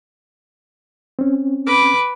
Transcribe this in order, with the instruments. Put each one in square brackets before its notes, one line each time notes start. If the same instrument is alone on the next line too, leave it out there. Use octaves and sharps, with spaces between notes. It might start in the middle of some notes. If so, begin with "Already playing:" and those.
[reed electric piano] C4 C#4
[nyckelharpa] B4 D6